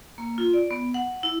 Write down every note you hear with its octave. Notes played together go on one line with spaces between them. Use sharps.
A#3
F4
D5
B3
F#5
E4